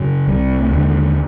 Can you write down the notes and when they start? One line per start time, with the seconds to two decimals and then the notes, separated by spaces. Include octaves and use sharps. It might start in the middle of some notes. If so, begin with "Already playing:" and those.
Already playing: F#2 C#3
0.27 C2 C3 G3
0.60 A3
0.71 D#2 D3 G#3